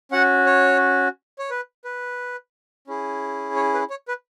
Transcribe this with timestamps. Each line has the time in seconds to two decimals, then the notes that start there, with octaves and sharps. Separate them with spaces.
0.12 C#4 F#4 F#5
0.46 C#5
1.39 C#5
1.50 B4
1.85 B4
2.87 C#4 E4 G#4
3.56 C#5
3.74 B4
3.90 C#5
4.08 B4